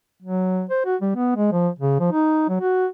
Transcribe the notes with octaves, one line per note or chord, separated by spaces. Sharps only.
F#3
C5
F#4
G3
B3
G#3
F3
C#3
F3
D#4
F#3
F#4